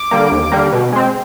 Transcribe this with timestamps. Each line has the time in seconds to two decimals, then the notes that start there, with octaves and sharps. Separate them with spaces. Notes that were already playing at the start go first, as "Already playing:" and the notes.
Already playing: D6
0.11 D3 G3 A#3
0.32 D#2
0.52 D3 G3 A#3
0.73 B2
0.92 G#3 C4